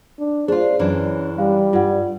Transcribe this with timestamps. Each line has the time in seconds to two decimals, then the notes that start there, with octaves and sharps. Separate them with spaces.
0.19 D4
0.48 D4 F4 G#4 C5
0.79 F#2 E3 C#4 D4
1.38 G3 F5
1.73 G2 F4 F#5